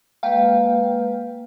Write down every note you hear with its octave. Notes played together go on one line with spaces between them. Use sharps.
G#3 A#3 B4 F5 G5